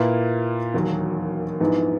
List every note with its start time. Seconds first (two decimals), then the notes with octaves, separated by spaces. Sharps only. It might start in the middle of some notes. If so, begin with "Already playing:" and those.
Already playing: A#2 A#3 E4 B4
0.74 E1 D#2 D#3 F#3
1.60 A#1 G#2 E3 B3 D#4